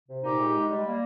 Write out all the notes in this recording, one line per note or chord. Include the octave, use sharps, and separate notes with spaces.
C3
A#2 D#4 G4
G#3
G#3
G3
A#3